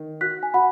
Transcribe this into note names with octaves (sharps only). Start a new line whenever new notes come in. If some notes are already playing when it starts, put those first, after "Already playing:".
Already playing: D#3
F#4 F#6 B6
G#5
F#4 F#5 B5